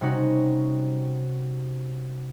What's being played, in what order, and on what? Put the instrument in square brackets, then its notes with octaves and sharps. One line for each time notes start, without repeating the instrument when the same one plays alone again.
[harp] C3 G3 C#4 D#4 F#4